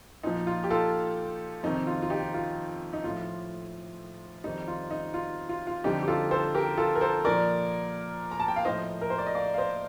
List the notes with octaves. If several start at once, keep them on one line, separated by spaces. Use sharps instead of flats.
A#2 F3 D#4
F4
G4
F4 A4
F2 C3 D#3 D#4
F4
F4
D#4 G4
F4
D#4
A2 F3 F4
F2 D#3 G3 D#4
F4
D#4
F4
F4
F4
F2 D3 G3 D#4 G4
G4
F4 A4
A4 C5
G4 A#4
F4 A4
A#4
A4 C5
A#2 F3 A#4 D5
A#5
A5
G5
F5
A2 F3 C5 D#5
A#4
C5
D5
D#5
D5 F5
F5
C5 D#5